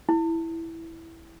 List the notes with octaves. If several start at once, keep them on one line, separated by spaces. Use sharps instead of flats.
E4